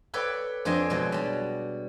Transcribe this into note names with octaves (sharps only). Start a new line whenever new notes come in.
A4 B4 C#5 D5 G5
F2 D4 C5 D#5 G#5
B2 F#3 G#3
G3 A5